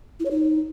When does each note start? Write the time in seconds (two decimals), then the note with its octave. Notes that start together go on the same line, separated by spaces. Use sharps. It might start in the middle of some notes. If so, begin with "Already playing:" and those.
0.20 E4
0.25 C#5
0.31 D#4